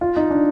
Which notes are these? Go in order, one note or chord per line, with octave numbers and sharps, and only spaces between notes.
F4
D#4
D4